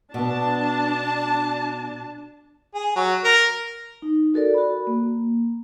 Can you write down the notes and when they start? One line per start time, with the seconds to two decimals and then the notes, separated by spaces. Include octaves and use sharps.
0.14 B2 B3 D4 A5
2.75 G#4
2.96 F#3
3.24 A#4
4.02 D#4
4.34 F#4 A4 A#4 D5
4.54 F#4 B5
4.87 A#3